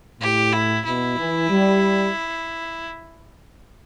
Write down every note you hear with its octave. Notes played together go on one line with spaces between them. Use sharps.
A2 G4
E4
B2 E4
E3
G3